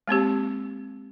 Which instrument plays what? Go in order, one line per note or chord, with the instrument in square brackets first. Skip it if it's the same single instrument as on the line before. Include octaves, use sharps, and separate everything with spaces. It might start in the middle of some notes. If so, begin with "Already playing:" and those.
[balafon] G#3 A#3 C4 G4